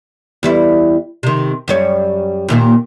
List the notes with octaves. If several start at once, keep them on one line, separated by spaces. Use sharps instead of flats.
E2 G3 E4
C3 D#3
F#2 G3 C#5
D#2 A#2 D#3